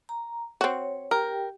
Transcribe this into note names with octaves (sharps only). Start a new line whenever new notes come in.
A#5
C4 F#4 C#5
G4 A#4 G5